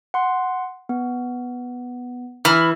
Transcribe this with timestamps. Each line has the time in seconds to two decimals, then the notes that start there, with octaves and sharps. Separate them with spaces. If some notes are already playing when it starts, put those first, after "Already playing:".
0.14 F#5 C6
0.89 B3
2.45 E3 B5 F6